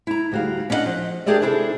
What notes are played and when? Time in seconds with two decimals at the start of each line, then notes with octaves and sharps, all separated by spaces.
0.07 E4 A#5
0.32 D2 G3 F#4 G#4 F5
0.70 C#4 D4 E4 D#5 F#5
0.86 F3
1.26 D4 G4 G#4 A#4 D5 E5
1.41 C3 D4 E4 G#4 A4